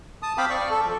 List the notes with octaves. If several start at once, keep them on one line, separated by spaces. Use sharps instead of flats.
A5 D#6
C4 F5 G5 B5 D6
D5 C#6
A4
F3